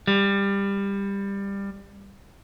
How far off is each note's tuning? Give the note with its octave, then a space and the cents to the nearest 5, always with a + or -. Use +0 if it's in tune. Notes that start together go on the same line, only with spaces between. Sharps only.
G3 +20